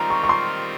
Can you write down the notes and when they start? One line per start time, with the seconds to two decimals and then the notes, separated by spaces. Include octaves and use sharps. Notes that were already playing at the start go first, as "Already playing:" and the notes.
Already playing: D#3 G3 C4 F4 A#4 A#5
0.10 C#6
0.23 C#6
0.29 C6